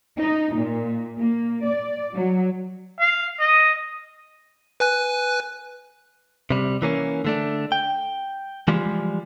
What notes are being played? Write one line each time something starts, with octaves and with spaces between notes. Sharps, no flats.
D#4
A#2
A#3
D5
F#3
F5
D#5
B4 G#5 F#6
C3 G3
E3 A#3 C#4
D3 A3 D4
G5
E3 F3 G3 G#3